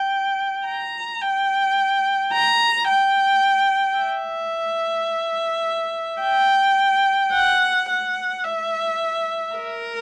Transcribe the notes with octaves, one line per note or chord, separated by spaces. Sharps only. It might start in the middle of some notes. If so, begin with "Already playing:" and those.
Already playing: G5
A#5
G5
A#5
G5
E5
G5
F#5
F#5
E5
A#4